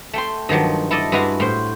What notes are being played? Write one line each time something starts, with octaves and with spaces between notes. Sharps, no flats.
A3 G5 C6
G2 D#3 F3 F#3
E4 A4 D5 D#5
G2 G#3 E4 F#4 G#4 F5
A2 C5